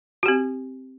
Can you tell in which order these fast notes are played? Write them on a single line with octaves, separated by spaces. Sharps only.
F#4 G4 C4